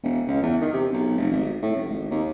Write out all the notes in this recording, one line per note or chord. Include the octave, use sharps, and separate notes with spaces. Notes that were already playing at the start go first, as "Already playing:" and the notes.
E1
C#2
E2
D#3
C3
B1
F1
G#1
A2
F1
G#1
D#2